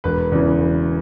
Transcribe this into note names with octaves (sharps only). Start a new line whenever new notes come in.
E1 B4
E2 C#3 E3
E1